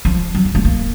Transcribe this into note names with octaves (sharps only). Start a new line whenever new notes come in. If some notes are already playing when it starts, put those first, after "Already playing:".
F3
F#3
F#3
A3
A#3